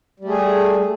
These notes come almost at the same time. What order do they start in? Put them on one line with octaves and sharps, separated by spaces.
G3 A3 G#4